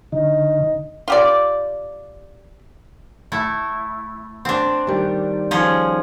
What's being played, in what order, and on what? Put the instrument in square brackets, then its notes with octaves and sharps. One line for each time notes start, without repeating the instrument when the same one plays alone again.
[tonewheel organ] D3 [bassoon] D#4
[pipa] F4 G4 D5
[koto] A3 E4
C4 D4
[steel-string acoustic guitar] D#3 G3
[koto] F3 C#4 G#4